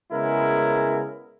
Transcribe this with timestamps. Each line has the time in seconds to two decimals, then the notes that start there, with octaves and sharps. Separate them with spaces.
0.12 C#3 G#3 B3 E4 A#4